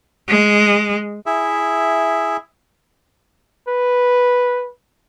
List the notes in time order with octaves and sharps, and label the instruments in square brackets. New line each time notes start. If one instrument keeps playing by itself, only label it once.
[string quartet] G#3
[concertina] E4 G#4 E5
[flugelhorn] B4